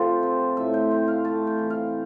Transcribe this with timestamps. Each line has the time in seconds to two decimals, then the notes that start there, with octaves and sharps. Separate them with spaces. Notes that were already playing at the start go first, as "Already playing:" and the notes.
Already playing: C3 F3 A3 F4 G4 A4 C5
0.23 C4
0.57 A2 E5
0.74 G5
0.91 C4
1.08 F5
1.24 A3 A5
1.47 G5
1.58 E3
1.70 F5